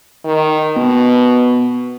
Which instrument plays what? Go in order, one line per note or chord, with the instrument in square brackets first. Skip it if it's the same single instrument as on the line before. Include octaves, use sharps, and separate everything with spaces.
[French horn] D#3
[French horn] B2 [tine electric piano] B3